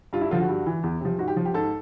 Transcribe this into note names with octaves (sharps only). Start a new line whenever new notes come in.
G2 F4
E4
D3 F3 F4
F#4
G2
E3
E2
C3 F3
G#2 F#4
G4
F3
G4
G#2 A4